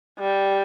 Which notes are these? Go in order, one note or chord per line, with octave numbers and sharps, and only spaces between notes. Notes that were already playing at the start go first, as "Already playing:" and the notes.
G3